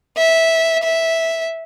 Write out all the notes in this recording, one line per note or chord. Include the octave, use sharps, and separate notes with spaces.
E5
E5